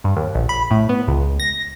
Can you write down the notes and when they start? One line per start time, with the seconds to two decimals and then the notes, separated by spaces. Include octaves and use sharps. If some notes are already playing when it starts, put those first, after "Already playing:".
0.04 G2
0.16 D#2
0.35 A#1
0.49 B5
0.71 A2
0.89 B3
1.08 C#2
1.40 A#6